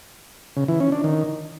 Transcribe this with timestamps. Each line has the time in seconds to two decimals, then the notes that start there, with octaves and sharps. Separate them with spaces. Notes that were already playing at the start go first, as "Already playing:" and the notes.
0.57 C#3
0.68 E3
0.80 C#4
0.92 D4
1.04 D#3